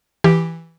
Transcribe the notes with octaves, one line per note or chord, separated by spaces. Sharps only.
E3 G4